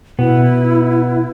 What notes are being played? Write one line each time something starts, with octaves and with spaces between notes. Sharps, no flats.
B2 B3 E4